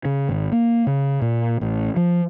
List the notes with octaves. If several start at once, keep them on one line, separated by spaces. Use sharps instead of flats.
C#3
G#1
A#3
C#3
A#2
A1
F3